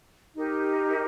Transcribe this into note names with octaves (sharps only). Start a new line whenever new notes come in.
D#4 G4 A#4